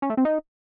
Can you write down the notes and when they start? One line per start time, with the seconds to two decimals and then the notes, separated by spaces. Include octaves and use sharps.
0.02 C#4
0.10 A3
0.17 C4
0.25 D#4